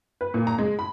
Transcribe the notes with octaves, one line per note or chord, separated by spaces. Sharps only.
B4
A#2
A#5
G#3
B5